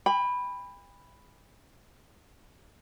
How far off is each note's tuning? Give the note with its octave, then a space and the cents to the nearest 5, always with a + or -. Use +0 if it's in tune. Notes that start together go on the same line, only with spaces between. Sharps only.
G5 +45 B5 +0